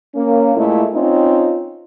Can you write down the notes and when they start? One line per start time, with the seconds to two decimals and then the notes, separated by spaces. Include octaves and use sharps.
0.15 A#3 C#4
0.55 A#2 G#3 A3 E4
0.92 C4 C#4 D#4 F4